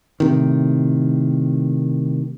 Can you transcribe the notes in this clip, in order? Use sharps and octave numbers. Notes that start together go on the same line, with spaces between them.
A2 C3 D#3